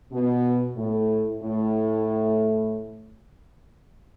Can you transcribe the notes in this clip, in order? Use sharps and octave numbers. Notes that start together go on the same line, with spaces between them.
B2
A2
A2